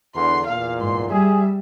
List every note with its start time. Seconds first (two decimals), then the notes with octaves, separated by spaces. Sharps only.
0.14 E2 D3 C6
0.46 E2 A#2 F5
0.80 G#2 C6
1.10 G3 G#4 E5